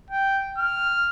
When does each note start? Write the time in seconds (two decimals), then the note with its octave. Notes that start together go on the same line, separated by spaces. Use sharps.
0.10 G5
0.58 F6